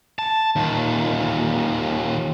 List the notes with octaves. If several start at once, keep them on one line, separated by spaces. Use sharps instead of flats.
A5
D#2 A#2